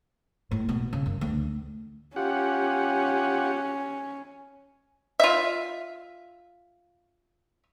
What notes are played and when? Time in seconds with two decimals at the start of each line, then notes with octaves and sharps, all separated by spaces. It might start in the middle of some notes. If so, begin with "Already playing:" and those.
0.51 A2
0.69 B2
0.93 C#3
1.06 F#2
1.21 D2
2.16 C#4 F4 G4 F#5
5.20 F4 E5